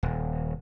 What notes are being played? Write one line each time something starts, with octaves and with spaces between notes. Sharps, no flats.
D#1